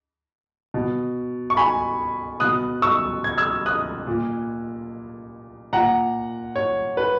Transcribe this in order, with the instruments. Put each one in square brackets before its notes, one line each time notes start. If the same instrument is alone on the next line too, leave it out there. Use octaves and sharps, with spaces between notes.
[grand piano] B2
C#6
G#5 B5
B2 D#6 F#6
C#6 E6
G#6
E6 G#6
D#6 F#6
A#2
A#2 F#5 A#5
C#5
B4